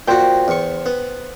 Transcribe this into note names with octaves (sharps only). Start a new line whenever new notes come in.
A#2 F#4 C5 G5
E2 C#6
B3